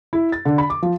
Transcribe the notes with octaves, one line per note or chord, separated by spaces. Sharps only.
E4
A6
D3
B5
D6
F3